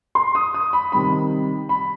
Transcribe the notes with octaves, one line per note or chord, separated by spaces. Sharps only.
C6
D#6
D#6
B5
C3 D#3 G3 B5
B5